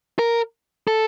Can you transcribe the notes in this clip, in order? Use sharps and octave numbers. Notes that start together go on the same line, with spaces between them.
A#4
A4